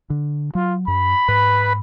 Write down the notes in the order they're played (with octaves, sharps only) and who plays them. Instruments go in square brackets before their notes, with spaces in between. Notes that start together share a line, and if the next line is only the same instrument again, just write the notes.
[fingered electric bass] D3
[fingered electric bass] F#3 [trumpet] F4
[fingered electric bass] F#2 [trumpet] B5
[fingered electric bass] G#2 [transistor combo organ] B4